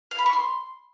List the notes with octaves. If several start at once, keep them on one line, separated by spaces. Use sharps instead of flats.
F5
B5
C#6
C6